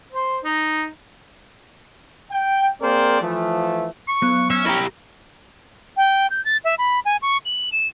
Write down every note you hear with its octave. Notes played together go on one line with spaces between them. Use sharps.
C5
D#4
G5
A#3 C4 G#4 A#4 C5 D5
E3 F3 A3
C#6
F#3 B3 F#6
C#4 E5
E4 G4 A#5 A#6
G5
G6
A6
E5
B5
G#5
C#6
F#7
E7